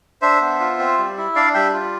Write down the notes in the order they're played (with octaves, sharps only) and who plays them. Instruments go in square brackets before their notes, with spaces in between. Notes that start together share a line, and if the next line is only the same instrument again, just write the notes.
[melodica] D4 C5 E5
B3
F4
C4
G3
E4
D4 D5 F5
G3 E5 G5
F4